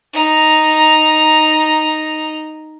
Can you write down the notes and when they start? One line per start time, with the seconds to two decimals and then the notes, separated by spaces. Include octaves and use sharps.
0.14 D#4 A#5